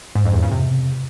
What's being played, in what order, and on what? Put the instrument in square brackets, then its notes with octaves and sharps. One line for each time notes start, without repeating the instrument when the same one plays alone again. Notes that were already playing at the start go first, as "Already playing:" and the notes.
[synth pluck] G#2
F2
E2
C#3
C3